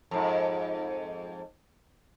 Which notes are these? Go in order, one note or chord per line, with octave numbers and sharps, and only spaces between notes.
F2 G#2